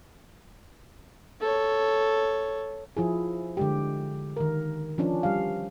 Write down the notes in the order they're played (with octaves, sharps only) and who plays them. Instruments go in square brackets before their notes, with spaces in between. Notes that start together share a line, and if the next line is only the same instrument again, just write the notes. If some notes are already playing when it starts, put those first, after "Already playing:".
[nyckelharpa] A4 C#5
[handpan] F3 E4 G#4
D3 G#3 G4
D#3 A#4
F3 C#4 D4
G3 F5